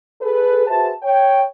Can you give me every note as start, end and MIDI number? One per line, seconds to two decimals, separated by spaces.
0.21 0.67 68
0.21 0.67 69
0.21 0.67 71
0.67 0.91 66
0.67 0.91 68
0.67 0.91 71
0.67 0.91 72
0.67 0.91 76
0.67 0.91 81
1.03 1.42 73
1.03 1.42 79